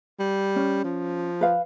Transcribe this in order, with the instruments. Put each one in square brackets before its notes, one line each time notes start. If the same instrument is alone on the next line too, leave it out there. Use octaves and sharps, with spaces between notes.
[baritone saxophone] G3
[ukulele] C#4
[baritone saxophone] F3
[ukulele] B4 F5